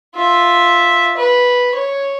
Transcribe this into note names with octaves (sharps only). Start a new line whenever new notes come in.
F4 E5
B4
C#5